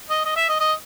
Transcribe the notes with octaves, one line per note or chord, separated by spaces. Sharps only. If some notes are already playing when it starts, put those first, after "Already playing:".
D#5
D#5
E5
D#5
D#5